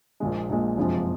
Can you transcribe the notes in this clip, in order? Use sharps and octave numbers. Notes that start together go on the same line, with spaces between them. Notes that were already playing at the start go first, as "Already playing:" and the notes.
A#1 A#2 G#3
A#1 A#2 G#3
F#1 F2 C3 F3 G#3